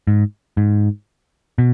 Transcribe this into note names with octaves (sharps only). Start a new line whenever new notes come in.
G#2
G#2
B2